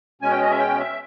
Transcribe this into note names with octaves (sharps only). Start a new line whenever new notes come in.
B2 G#3 C#4 G#5
G5
D#5
E5
G5
E5